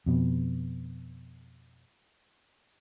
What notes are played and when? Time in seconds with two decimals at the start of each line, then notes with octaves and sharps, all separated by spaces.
0.06 F2 B2